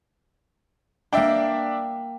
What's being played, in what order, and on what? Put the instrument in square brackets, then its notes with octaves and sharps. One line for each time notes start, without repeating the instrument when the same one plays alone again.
[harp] A#3 G5 [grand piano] D4 D5 E5